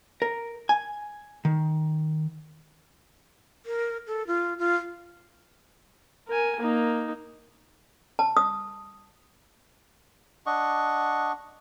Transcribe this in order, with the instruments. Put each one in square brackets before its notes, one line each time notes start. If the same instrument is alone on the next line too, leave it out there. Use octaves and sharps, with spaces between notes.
[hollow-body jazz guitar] A#4
G#5
D#3
[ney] A#4
A4
F4
F4
[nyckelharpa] A#4 G#5
A#3 D#4
[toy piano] A5
D#6
[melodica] D4 D#5 F#5 C#6